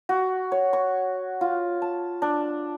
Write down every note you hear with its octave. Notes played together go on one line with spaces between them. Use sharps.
F#4
C#5
C#6
F4
A5
D4